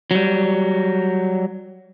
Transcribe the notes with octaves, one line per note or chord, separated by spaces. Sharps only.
F#3 G3